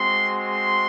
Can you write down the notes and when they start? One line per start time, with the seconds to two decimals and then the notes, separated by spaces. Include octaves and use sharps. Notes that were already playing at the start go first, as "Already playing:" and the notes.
Already playing: G#3 C4 F#4 C6
0.39 C6